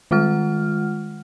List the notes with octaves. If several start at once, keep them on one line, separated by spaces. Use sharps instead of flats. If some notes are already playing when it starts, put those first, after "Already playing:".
D#3 G#3 F4 F#5 F6